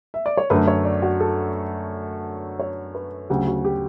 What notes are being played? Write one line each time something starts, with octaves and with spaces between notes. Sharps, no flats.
E5
D5
C#5
F#2 D3 A3 B4
C#5
D5
F#4
A4
C#5
B4
D2 C#3 F#3 G4
F#4
G4